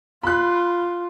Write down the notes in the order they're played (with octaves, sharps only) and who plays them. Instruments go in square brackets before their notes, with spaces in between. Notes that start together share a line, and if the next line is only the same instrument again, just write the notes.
[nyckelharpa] F4 [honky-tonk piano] B5 F#6